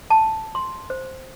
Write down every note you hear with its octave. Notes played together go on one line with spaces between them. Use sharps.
A5
C6
C5